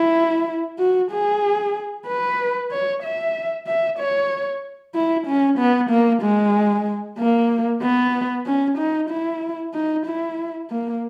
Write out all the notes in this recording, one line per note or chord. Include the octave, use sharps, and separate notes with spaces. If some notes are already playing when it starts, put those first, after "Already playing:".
Already playing: E4
F#4
G#4
B4
C#5
E5
E5
C#5
E4
C#4
B3
A#3
G#3
A#3
B3
C#4
D#4
E4
D#4
E4
A#3